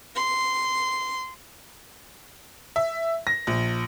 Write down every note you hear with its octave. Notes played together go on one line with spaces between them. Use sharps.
C6
E5
A#6
A#1